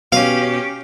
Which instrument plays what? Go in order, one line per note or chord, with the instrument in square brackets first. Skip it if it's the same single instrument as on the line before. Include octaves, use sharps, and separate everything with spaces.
[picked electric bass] B2 [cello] C#4 G4 [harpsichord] F5